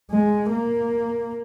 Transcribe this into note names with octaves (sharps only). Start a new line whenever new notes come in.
G#3
A#3